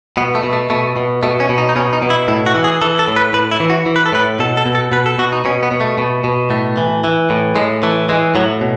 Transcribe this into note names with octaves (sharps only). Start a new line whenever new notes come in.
B2 B3
A3
B2
A3
B2 A3
B2
B2 A3
C#4
B2
D#4
D#4
B2 C#4
D#4
B2
E4
A2 E4
F#4
E3
G#4
E3 A4
A4
A2
B4
A2 B4
E4
E3
F#4
E3
B4
A4
A2 B4
B2 A4
A4
B2
A4
B2 B4
A4
B2 F#4
D#4
B2 C#4
B3
B2
A3
B2
B2
A2 A3
E3
E3
A2
A2 G#3
E3 A3
E3 G#3
A2 F#3
B2